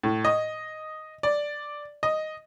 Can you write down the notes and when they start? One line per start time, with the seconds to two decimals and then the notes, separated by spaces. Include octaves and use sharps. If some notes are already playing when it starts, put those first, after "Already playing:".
0.03 A2
0.25 D#5
1.23 D5
2.03 D#5